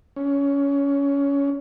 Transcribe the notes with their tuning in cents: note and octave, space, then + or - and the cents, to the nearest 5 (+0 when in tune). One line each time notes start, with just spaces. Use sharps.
C#4 +20